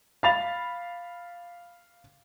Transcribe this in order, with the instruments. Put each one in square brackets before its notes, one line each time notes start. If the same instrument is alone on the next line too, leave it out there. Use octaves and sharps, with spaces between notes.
[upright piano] F5 B5 A6 F7